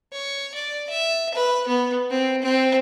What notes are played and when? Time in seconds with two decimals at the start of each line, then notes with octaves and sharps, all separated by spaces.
0.13 C#5
0.54 D5
0.89 E5
1.34 B4
1.67 B3
2.10 C4
2.42 C4